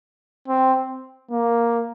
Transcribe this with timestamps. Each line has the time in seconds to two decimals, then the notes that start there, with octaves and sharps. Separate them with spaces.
0.48 C4
1.31 A#3